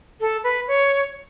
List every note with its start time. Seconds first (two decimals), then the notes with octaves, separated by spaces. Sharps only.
0.21 A4
0.44 B4
0.68 C#5